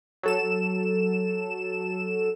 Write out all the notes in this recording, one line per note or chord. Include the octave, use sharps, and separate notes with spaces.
F#3 A4 E7